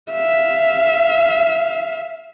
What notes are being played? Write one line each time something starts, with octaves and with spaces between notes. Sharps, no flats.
E5 F5